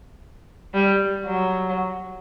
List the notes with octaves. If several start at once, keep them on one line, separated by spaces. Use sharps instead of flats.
G3
F#3